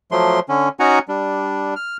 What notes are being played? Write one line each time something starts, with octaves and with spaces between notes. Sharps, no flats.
F3 F#3 A3 C6
D3 C#4
C#4 D#4 F#4 F#5 G#5 A#5
G3 D4
F6